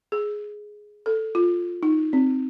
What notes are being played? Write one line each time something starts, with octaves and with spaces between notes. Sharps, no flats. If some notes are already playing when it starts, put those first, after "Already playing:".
G#4
A4
F4
D#4
C4